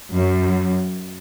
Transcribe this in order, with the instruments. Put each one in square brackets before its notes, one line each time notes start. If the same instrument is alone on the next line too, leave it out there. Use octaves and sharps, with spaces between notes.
[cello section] F#2